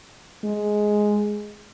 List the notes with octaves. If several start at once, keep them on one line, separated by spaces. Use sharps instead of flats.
G#3